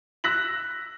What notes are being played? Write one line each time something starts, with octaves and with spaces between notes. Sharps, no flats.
E6 F#6 A#6 B6 F#7